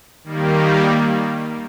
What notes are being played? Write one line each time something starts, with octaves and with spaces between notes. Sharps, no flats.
D#3 G3 A#3